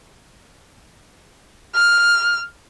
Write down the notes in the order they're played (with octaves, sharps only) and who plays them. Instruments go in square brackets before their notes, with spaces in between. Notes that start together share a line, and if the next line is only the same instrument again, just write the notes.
[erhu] F6